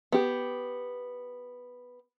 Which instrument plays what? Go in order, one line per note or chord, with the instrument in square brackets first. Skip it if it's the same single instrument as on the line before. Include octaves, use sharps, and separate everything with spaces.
[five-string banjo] B3 G4